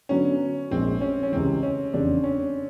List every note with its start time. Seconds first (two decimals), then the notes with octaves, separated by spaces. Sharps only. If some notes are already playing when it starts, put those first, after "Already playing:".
0.09 D3 F#3 B3 C#4
0.71 A#1 A#2 F3 G#3 C4
1.01 C#4
1.23 C#4
1.32 C#2 C3 E3 C4
1.63 C#4
1.94 F1 E2 C#3 D4
2.24 C#4